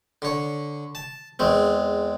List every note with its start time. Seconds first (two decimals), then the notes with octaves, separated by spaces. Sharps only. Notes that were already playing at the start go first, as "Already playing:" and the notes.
0.22 D3 C#5
0.95 A5
1.39 E2 G#3 C4